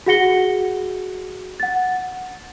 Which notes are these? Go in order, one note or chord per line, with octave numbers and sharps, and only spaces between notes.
F#4 G#4 F#5 A#6 C#7 G7
F#5 A6